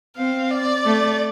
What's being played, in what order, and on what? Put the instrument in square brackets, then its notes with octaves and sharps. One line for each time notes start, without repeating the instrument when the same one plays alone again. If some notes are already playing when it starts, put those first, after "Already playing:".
[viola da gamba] C4 [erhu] F5
[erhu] D5
[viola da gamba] A3